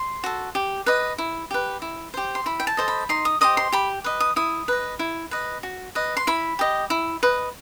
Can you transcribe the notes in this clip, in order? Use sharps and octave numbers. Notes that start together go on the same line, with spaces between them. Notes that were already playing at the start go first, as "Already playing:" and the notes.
Already playing: C6
F#4 A4
G4
B4 D#5
E4
G4 B4
E4
G4 C5
C6
E4 B5
G5
A5
A4 C5 D#5
B5
D#4 C6
D#6
G4 C5 D#5 D#6
C6
G4 B5
B4 D#5
D#6
E4 D#6
B4 D#5
E4
B4 D#5
F#4
B4 D#5
C6
E4 B5
G4 D#5
E4
B4 D#5